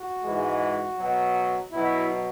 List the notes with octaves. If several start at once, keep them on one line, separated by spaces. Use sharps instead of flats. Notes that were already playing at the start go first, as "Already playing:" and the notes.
Already playing: F#4
G#2 E3 G#3
B2 F#3
B2 F#3 E4